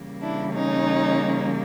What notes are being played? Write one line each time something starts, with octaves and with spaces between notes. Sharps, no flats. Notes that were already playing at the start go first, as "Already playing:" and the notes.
Already playing: C#3 E3 G3 A#3
D4 E4
C#4 D#4